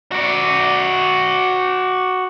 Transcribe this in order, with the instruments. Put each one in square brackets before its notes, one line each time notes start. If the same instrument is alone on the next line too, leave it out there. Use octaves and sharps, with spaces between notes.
[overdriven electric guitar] F#4 D5